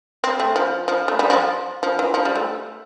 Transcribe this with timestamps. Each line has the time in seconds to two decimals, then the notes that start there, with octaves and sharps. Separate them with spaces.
0.24 C4
0.40 A3
0.56 F3
0.88 F3
1.08 A3
1.19 G3
1.30 F3
1.83 F3
1.99 E3
2.14 F3
2.25 G3
2.35 A3